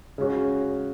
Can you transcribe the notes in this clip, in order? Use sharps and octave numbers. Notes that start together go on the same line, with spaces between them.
C#3 G#3 C#4 F#4